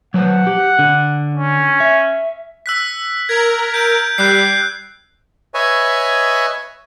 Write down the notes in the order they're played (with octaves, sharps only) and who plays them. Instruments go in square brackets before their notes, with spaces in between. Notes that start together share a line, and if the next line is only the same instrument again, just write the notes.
[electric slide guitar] F#3 B4 C5 [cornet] F#5
[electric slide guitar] G4
D3
[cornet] C#4
[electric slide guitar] E5
[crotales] E6 F#6 B6
[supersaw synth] A#4 [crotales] G#6
[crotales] G6 D7
[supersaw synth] G3 [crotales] F#6 G6 C7
[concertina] B4 C#5 D#5 E5 G#5